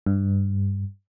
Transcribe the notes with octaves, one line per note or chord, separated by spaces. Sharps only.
G2